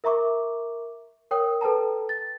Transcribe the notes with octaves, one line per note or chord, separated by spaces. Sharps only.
A#4 E5 A#5 C#6 D6
A#4 C#5 G5 D#6
A4 B4 G5 A5 A#5
A6